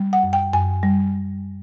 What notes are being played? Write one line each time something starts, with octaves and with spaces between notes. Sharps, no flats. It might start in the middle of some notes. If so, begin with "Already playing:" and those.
Already playing: G3
F#5
F#2
G5
F#2 G#5
G3